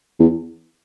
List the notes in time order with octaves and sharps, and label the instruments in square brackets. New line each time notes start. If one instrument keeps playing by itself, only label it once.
[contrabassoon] E2